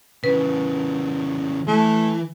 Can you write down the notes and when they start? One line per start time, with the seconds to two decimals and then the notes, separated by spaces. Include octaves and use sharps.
0.24 C#3 E3 B4
1.67 E3 A3